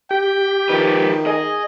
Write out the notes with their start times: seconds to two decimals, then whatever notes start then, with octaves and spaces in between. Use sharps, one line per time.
0.11 G4 G5
0.69 D#3 F3 B4
1.27 G#4 D#5